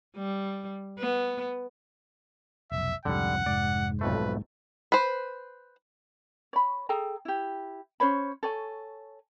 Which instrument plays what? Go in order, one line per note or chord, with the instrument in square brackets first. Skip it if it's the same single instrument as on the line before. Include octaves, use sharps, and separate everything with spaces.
[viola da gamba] G3
B3
[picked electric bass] F1 B1 [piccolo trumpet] E5
[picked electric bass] C2 F2 G#2 [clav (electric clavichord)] D3 G3 [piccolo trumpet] F#5
[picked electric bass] F1 [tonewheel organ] G#2 [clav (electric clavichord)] D5
[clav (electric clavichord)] B1 F2 A3 [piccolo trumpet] B4
[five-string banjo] B4 C5
[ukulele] C#5 B5
G#4 A4 G5 A#5
E4 G4
C#4 C5 C#5 B5
A4 C#5 G#5